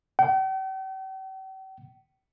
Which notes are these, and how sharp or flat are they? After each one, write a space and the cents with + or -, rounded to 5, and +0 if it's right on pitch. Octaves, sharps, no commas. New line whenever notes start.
G5 -45